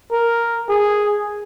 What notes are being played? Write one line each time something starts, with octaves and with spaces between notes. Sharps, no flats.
A#4
G#4